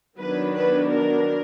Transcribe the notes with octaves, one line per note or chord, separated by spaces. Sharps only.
D#3 F#3 B3 D4 B4
B4
A#4